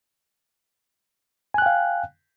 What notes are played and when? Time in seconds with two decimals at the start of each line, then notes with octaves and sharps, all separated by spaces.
1.54 G#5
1.58 F#6
1.62 G5
1.66 F5